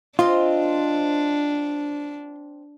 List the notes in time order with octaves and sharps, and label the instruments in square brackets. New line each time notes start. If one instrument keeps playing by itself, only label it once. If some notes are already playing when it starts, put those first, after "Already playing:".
[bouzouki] C4 C5 D#5 [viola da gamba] D4 [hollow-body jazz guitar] F4